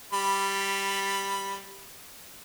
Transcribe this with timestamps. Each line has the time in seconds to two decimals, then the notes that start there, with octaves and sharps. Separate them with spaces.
0.13 G3 B5